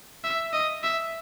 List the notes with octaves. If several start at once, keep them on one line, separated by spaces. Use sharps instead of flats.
E5
D#5
E5